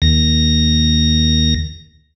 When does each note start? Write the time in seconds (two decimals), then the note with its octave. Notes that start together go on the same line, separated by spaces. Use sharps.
0.02 D#2 A#6